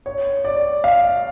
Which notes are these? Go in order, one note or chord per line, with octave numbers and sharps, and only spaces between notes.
C#5
D5
F5